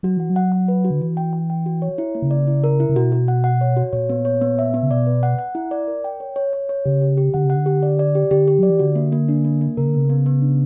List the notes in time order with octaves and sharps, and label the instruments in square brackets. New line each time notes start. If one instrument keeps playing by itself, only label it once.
[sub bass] F#3 [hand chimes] F#4
[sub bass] E3 [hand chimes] F#5
[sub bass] F#3
[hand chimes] F#5
F#5
B4
F#4
[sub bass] D3
[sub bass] E3 [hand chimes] F#4
[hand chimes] G5
G5
G5
F#4
C#5
E4
A#3
[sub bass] C#3
[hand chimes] D5
E4
A#4
E4
[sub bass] C#3
[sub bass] B2 [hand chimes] F#4
[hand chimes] F#4
F#5
F#5
C#5
F#4
[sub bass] A#2 [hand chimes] C#5
[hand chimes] B3
C#5
B3
E5
B3
[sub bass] C#3
[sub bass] B2 [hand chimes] D5
[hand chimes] B4
F#5
F#5
E4
D5
A#4
G5
C#5
C#5
C#5
C#5
[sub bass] C#3 [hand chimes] G4
[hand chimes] G4
G4
[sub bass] D3 [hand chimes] F#5
[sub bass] C#3
[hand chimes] F#5
[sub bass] D3
[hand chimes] G4
D5
D5
G4
[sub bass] D3 [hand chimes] G4
[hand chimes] G4
[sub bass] F#3 [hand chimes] D5
[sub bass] E3
[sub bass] D3 [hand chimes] F#4
[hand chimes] A#3
A#3
D4
A#3
A#3
[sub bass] C#3 [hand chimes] A#4
[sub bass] D3
[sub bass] C#3 [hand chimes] B3
[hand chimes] B3
B3
D4